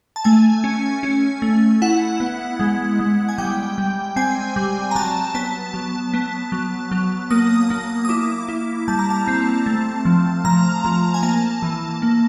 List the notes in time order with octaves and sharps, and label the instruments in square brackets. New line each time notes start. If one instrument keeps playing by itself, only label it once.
[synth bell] A5
A3 G#5
C#4
C#4
A3
E4 F#5
B3
G#3
G#3
G#5
G3 G5
G3
C4 G#5
G3
A#5
F#3 A5
B3 A5
F#3
B3
F#3
F#3
A#3 D#6
A#3
D#6
E4 D6
E4
G3 A5
A#5
A5
C4
A3
F3
F3 A#5
F3
G#5
A#3 A5
E3
A#3